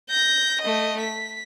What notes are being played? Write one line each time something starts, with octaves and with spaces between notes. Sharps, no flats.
G6 A#6
A3 D#5
B6